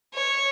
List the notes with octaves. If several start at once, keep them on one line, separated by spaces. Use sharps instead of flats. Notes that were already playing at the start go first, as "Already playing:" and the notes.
C#5